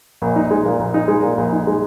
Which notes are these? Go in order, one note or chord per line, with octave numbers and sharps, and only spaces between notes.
A#1
D#4
G#3
A#2
A#1
D#4
G#3
A#2
A#1
D#4
G#3